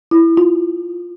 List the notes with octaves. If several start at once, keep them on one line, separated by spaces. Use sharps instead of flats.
E4
F4